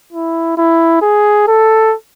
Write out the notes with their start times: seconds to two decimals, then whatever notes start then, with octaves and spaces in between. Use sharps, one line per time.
0.13 E4
0.57 E4
1.02 G#4
1.48 A4